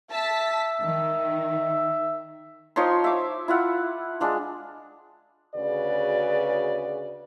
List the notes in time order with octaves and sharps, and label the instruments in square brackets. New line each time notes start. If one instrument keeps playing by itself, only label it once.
[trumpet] E5 [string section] A5 B6
[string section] D#3
[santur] F3 D#4 C#5 C6
E5 D6
E4 F4 F#5
G#3 D4 F4
[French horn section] D2 C#3 F#4 G#4 B4 D5